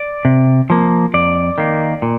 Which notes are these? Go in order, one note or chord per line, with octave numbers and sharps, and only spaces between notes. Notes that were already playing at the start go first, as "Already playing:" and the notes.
Already playing: D5
C3
F3 A#3
F2 D5
D#3 A#3
A#2